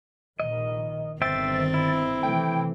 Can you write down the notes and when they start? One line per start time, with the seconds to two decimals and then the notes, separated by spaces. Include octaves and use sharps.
0.40 A#1 D#3 D#5
1.22 G1 G2 D#3 C4 C5 E5 G5 A6
1.74 E4
2.23 C3 E3 A3 G5